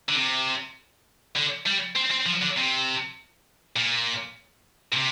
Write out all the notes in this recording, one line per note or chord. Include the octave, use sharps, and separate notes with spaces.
D3
C3
D3
G3
C4
C4
F3
D3
C3
A#2
A#2
C3